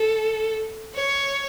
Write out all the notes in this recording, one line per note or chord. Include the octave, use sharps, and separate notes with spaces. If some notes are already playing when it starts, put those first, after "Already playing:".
Already playing: A4
C#5